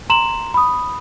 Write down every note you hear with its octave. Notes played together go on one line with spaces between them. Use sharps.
A#5 C6 E7 F#7
B5 D#6